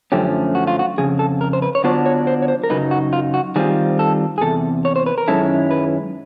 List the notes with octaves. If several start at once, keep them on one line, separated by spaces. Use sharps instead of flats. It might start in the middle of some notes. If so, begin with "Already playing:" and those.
F#2 D3 F3 A3 C#4 G4
F#4
F4
F#4
F2 C#3 G#4
A4
A#4
C5
B4
C#5
D3 F#3 B3 D4 F4 C5
C#5
C5
C#5
C5
A#4
F#2 C#3 F#3 D#4 B4
F#4
F4
F#4
D#3 G3 C4 F4 G#4
A4
G#4
E2 C3 A4
C#5
C5
B4
A#4
F#2 D#3 G#3 C#4 E4 A4
B4